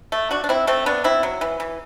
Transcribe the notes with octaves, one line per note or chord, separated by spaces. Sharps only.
A3
D4 F#4
D4
C4 E4
A3 C4
B3 D4
C4 E4
F#3
E3
E3